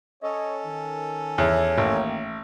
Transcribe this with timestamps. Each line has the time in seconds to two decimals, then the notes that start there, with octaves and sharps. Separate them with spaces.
0.23 C#4 A4 C#5 D#5
0.66 D#3
1.38 E2 C#5
1.78 A1 D#3 A#3